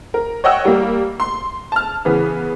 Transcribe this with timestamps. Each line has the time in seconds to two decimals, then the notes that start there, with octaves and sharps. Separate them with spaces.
0.14 A#4
0.44 C#5 D#5 F#5 G5 E6
0.65 G3 A#3
1.20 C6
1.72 A5 F6
2.05 C#3 E3 B3